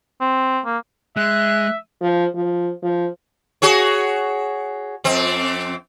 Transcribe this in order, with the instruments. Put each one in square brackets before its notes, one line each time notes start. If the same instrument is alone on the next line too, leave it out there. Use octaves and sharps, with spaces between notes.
[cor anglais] C4
A#3
[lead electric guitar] G#3 [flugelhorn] E5 [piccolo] F#6
[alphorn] F3
F3
F3
[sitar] F#4 G#4 C#5
F2 C4